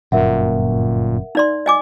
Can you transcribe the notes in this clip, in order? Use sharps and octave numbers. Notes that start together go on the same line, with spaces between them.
G1 F#2 A#2 A#4 E5 F#5
D#4 D5 C6
D#5 G#5 D6